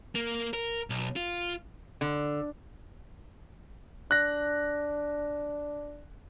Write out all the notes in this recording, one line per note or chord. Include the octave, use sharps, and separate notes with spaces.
A#3
A#4
B1
F4
D3
D4 F#6 A#6